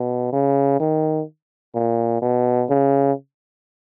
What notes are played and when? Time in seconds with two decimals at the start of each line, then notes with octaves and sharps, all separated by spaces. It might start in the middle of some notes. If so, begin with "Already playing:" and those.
Already playing: B2
0.33 C#3
0.80 D#3
1.75 A#2
2.22 B2
2.70 C#3